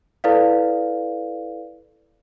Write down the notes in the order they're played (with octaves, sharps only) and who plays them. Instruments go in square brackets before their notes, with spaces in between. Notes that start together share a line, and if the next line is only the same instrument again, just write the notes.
[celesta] E4 A4 B4 D5 F5